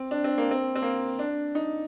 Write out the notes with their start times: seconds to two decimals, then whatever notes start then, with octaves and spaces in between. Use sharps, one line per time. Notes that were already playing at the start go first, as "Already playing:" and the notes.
Already playing: C4
0.11 D4
0.24 C4
0.38 A#3
0.51 C4
0.76 C4
0.82 A#3
1.19 D4
1.55 D#4